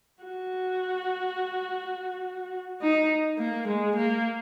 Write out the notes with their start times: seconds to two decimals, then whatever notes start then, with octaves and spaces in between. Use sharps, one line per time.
0.23 F#4
2.81 D#4
3.38 A#3
3.67 G#3
3.96 A#3